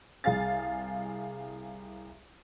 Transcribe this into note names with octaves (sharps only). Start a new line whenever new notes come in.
C2 G#4 F5 G#5 A6